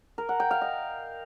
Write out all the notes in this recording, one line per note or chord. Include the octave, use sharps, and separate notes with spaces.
A#4
F#5
G5
F5
D#5